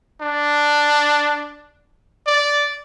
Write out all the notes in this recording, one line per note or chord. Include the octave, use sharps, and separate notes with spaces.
D4
D5